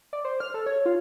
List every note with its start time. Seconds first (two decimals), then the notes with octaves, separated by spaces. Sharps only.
0.13 D5
0.25 C5
0.40 F6
0.54 A4
0.66 C#5
0.86 F4